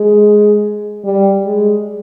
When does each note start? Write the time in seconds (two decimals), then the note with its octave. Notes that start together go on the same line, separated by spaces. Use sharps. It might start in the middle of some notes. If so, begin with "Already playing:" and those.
Already playing: G#3
1.04 G3
1.45 G#3